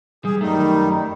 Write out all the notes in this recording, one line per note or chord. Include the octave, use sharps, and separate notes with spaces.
G3 G#4
F#2 D#3 G3 A3 D#4